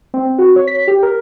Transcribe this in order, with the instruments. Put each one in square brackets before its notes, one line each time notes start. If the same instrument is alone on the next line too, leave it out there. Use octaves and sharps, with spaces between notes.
[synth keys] C4
F#4
C#5
B6
G4
A#4